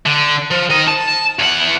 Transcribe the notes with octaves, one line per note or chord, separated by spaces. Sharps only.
D3
F3
D#3 D#5
A5
E2 F#5